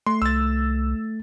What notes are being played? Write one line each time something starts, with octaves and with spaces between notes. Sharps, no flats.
A3 C6
C2 E6 A6